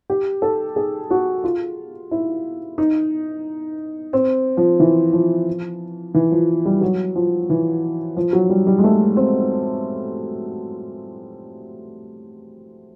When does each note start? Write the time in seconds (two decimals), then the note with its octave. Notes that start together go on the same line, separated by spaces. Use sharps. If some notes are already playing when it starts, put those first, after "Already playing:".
0.10 G4
0.42 A4
0.76 G#4
1.10 F#4
1.44 F4
2.11 E4
2.78 D#4
4.13 C4
4.57 F3
4.80 E3
5.13 F3
6.14 E3
6.32 F3
6.65 G3
6.81 F#3
7.16 F3
7.50 E3
8.16 F3
8.33 F#3
8.50 G3
8.67 G3
8.78 G#3
8.84 A3
9.17 C4